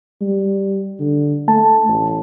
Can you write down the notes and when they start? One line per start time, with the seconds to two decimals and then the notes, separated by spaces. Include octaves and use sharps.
0.21 G3
1.00 D3
1.48 A3 A5
1.88 A1